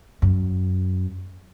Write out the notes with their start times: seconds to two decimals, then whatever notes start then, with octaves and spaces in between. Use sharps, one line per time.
0.22 F#2